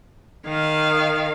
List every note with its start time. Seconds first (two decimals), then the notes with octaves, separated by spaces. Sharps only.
0.45 D#3 F5